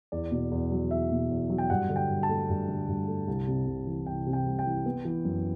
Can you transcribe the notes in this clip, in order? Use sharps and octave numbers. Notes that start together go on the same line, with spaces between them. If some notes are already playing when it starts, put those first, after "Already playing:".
E2 D5
B2
E2
F#3
E2 E5
B2
E2
F#3
G5
G2 F#5
D3
G5
G2
A5
A3
G2
D3
G2
A3
C2
C3
C2
E3
C2 G5
C3
G5
C2
G5
E3
B3
E3
F#2